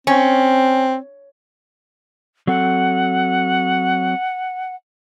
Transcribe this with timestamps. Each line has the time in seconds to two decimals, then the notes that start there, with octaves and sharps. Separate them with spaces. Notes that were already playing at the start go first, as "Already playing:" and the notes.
0.07 C4 C#4
2.47 F#3 C4 A4 F#5